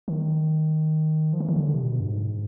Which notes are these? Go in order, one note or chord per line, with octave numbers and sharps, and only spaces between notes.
D#3
F3
E3
D#3
D3
C3
A#2
B2
G2
G#2